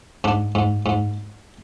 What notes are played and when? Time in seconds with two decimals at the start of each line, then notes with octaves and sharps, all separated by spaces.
0.24 G#2 D4
0.55 G#2
0.86 G#2